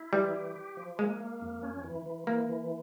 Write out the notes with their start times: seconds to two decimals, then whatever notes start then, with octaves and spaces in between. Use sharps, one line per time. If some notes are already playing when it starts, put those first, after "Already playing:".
Already playing: E4
0.13 E3 G3
0.34 G4
0.56 G4
0.77 F3
0.99 G#3 A#3
1.20 A#3
1.41 F2
1.63 C#4
1.84 E3
2.06 E3
2.27 E3 A#3
2.49 E3